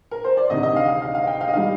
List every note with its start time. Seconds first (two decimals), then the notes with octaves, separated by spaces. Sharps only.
0.11 A#4
0.24 C5
0.37 D5
0.50 D2 C3 D#3 D#5
0.63 D#5
0.76 F5
0.88 F5
1.02 F5
1.15 F5
1.27 G5
1.41 F5
1.48 D#5
1.53 D#3 G3 F5